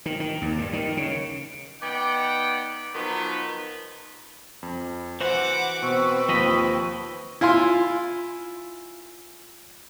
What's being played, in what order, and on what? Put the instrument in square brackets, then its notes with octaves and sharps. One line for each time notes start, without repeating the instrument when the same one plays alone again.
[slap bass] D#3
D#3
D#2
G2
D#3
C#3
[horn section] B3 D#4 D5 F#5 G5
D#3 F3 F#3 B3
[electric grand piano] F2
[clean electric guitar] E3 F#4 [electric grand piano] C5 [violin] F#5 D6
[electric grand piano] B2 D7 [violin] C4 B4 [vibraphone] C5 C#6 E6
[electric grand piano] D#2 [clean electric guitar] F3 D#5 B5
[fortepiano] E4 F4 G#5 C6